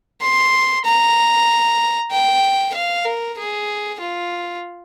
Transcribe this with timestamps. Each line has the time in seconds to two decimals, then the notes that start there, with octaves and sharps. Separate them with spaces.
0.21 C6
0.85 A#5
2.12 G5
2.74 F5
3.05 A#4
3.38 G#4
4.01 F4